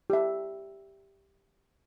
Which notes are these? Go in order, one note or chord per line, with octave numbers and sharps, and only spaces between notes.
G4 E5